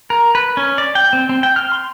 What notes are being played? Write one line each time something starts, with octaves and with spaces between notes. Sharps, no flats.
A#4
B4
C#4
D5
G5
C4
C4
G5
F6
C6